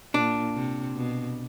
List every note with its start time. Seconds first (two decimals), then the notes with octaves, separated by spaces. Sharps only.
0.14 A#2 D4
0.55 C3
0.96 B2